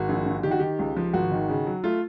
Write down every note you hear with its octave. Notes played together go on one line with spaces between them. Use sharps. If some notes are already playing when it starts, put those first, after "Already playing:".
Already playing: G#1 F#4
A#1
A#1
D#3 G4
F#4
D#3 G4
C#2
F3
G#1 F#4
D#3
C#3
F#3
A3 F4